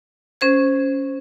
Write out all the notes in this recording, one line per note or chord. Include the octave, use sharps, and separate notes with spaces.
C#4 C5 G#6